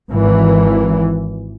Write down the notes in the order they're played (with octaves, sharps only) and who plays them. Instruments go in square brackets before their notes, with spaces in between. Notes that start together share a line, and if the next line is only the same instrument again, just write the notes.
[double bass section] G#1 E3